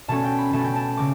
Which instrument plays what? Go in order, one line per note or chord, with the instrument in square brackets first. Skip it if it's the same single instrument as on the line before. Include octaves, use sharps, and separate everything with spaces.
[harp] B2 A3 C#4 A5
G5
B5
B2 A3 C#4 A5
G5
A5
C#3 D6